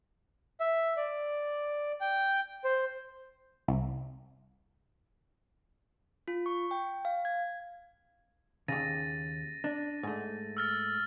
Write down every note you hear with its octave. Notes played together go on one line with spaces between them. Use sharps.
E5
D5
G5
C5
C2
F4
C#6
G5
F5
G#6
D#2 C#3 A6 A#6 D#7
D4
G#2 A3
E6 F6 A6